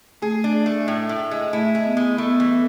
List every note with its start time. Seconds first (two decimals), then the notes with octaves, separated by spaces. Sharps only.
0.22 A3 G#4
0.44 D4
0.66 A3
0.88 A2
1.09 A2
1.31 G#3
1.53 A3 E4
1.75 G#3
1.86 B3
1.97 G#3
2.18 A3 B3
2.40 E3